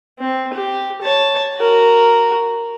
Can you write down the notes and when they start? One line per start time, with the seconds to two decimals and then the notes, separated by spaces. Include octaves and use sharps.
0.20 C4
0.53 G4
1.02 C#5 A5
1.58 F#4 A#4